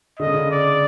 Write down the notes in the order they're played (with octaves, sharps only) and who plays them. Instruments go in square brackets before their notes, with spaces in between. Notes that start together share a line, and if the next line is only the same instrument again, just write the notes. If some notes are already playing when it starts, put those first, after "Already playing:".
[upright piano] D3 [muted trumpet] D#5
[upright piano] C#3
D3
[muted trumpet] D5